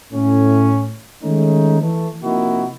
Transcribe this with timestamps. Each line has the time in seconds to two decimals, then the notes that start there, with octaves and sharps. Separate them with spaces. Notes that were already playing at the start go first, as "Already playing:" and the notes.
0.13 A2 C#4
1.23 D#3 G#3 A3 C#4 D#4
1.82 E3 A3
2.22 C3 F3 A#3 D#4 E4 F#4